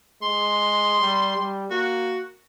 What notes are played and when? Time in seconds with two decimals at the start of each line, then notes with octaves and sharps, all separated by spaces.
0.22 G#3 C6
1.01 G3
1.37 G3
1.71 A#3 F#4